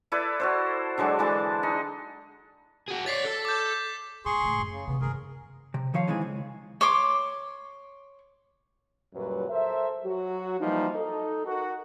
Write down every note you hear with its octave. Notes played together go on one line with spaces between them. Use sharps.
E4 A4 B4 D5
F#4 A4 C5
D3 F#3 G#3 D4
D3 E3 G#3 A5
D#4
F#4 G#4
C#5 D5 A6 B6 C7
A4
D6 G6
G2 A#2 G#4 C6 C#6
C#2 A2
F#2
C#3
C3 B3 C#4
G2 D#3 G#4 A#4
C3
D#3 F3 C#5 F5
D#3 E3 G#3 C4 G#4
C#2
C#5 C6 D6
C#2 F#2 A#2 F#3 G3 B4
A4 A#4 C5 E5
F#3 F#4
E3 F3 G3 A#3 D#4
D#4 A4
F#4 A#4